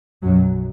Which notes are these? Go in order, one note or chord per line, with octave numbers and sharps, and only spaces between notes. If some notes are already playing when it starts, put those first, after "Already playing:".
B1 F#2 B2 F#3